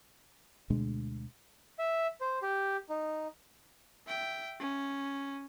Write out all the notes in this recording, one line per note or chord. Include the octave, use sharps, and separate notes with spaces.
D2 B2 G#3 D4
E5
C5
G4
D#4
E5 G5
C#4